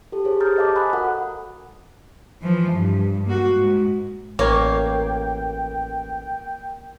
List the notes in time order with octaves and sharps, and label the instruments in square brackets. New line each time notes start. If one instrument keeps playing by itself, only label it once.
[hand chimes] G4 A4
G#4 A4 C5 C#5
G4 A#5 D#6 F6 G6 A6
A4 C5 D#5 F5 A5 D6
F5 G#5 A#5 B5 D#6 F#6
F#4 A4 A#4 F#5
[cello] E3 F3
G2
A#3 F#4
G#2
[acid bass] A1 [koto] A#3 [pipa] C#5 [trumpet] G5